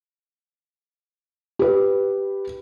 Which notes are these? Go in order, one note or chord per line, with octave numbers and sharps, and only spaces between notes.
G4 B4